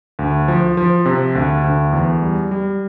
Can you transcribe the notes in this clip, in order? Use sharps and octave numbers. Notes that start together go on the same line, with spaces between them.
D2
F3
F3
C3
D2
D2
E2
G3
G3